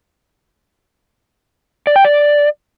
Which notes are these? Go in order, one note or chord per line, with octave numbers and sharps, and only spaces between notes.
D5
G5
D5